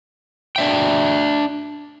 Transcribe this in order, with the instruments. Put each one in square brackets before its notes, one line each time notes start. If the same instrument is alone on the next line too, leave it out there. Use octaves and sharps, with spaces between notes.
[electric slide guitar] D4 E5 G5